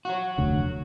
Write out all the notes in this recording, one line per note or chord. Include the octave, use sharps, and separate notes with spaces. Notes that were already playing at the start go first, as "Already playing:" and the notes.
F#3 F#4
F1 D2 D3